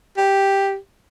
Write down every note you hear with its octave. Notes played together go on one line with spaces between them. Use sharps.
G4